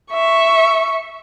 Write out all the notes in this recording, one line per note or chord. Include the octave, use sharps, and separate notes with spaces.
E5 C#6